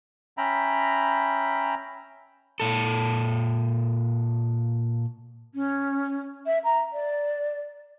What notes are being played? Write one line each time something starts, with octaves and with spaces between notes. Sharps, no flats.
C#4 E5 G5 A#5 B5
A#2 A4
C#4
E5
A#5
D5